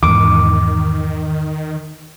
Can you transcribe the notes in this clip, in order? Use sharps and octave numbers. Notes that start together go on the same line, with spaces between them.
E2 G#2 D#3 D6